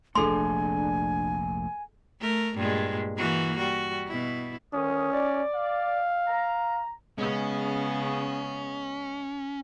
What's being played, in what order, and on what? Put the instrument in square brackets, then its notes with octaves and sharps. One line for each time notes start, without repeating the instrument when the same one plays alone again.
[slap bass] F1 A#1 A3 [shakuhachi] D4 [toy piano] G#4 A4 C6 [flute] G#5
[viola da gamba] A3 A#4
G2 A#2 G#3
E3 A#3 F#4
G3 F#4
B2 E4
[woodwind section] D2 D#3 D#6 [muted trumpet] C#4
[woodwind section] D5
[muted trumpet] F5
[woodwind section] A#5
[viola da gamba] C#3 B3 [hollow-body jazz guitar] G#3 [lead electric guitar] C#4